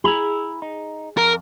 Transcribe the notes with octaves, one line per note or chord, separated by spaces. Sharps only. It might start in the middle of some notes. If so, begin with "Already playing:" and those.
E4 G#4 A#5 B5
D#4
F2 A#4